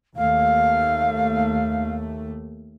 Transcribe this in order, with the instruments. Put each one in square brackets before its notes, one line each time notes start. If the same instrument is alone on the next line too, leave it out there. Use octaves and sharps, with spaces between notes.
[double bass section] D#2 A3 [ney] F5